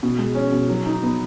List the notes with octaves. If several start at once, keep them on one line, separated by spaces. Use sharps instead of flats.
B2
G#3
C#4
B2
F#3
D#4
B3